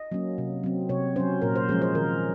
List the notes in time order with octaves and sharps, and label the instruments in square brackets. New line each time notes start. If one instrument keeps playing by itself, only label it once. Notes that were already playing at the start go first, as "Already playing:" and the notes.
Already playing: [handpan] D#5
F#3 A#3 C#4
C3
F#3 C4
C3 C#5
F#3 C#4 C5
A#2 A#4
C5
F3 G#3 C#4 G#4
C5
D#3 A#4